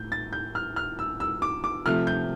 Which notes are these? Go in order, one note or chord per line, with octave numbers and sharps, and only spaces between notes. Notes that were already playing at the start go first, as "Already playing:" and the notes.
Already playing: A2 G6
A6
G6
F6
F6
E6
E6
D6
D6
C3 F3 A3 F6
G6